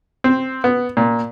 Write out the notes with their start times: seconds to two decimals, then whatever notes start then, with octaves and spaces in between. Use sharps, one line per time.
0.24 C4
0.64 B3
0.97 A#2